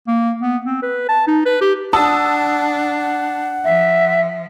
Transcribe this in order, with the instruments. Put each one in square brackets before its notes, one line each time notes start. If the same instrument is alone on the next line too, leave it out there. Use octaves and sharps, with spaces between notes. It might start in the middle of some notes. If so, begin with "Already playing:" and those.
[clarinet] A#3
B3
C4
B4
A5
D#4
B4
G4
[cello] D4 [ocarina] F#5 [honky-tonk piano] A5 D#6 E6
[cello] F3 [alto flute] E5